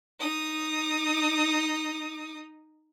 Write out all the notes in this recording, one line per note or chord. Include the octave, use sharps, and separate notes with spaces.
D#4 D#6